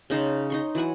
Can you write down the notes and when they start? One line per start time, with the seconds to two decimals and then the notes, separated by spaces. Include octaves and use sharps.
0.10 C#3 D#4 A5 C6
0.50 D#4 C6 C#6
0.75 E3 F#3 F#5 G#5